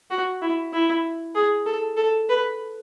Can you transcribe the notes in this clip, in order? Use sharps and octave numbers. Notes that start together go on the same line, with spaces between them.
F#4
E4
E4
G#4
A4
A4
B4